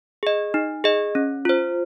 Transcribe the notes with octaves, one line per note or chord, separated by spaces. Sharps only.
G#4 D#5
D#4
G#4 D#5
C#4
F4 C5